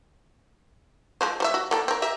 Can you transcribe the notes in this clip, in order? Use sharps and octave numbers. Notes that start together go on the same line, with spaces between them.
F3 G#3 C5
G3 C5 E5
F#4
A#3 A4 G5
C4 A#4
G4 A#4 E5